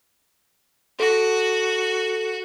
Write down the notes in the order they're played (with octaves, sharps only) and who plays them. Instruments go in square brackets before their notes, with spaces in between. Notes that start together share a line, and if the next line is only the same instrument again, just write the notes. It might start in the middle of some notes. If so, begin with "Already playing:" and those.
[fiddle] F#4 [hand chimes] A4 A#6